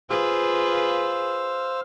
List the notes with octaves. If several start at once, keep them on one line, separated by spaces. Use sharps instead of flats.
F4 G#4 B4 C5 F5 E6